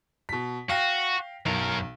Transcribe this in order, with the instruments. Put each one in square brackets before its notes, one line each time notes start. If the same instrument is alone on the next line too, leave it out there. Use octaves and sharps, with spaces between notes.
[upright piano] B2 B6
[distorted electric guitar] F#4 [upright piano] F5 G5 A#6
[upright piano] B1 [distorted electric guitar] F#2 A#4